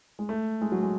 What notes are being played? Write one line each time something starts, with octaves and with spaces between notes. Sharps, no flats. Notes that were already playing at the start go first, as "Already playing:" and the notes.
G#3
A3
G#3
F#3
G#3